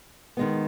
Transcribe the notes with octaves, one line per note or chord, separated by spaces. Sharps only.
D#3 G#3 B3